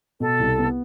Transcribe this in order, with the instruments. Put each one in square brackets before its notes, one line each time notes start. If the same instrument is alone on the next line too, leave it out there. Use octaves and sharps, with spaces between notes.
[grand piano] B2 [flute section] A4
[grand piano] C2
B3